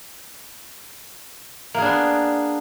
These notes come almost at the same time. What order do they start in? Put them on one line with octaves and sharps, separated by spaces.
A#3 G#4 D4 B3